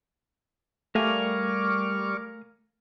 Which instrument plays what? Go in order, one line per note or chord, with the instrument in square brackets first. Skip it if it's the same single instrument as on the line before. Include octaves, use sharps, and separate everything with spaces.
[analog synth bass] G3 [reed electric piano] A3 [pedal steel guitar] A#4 F5 G#5 [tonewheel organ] C#6 D6 F6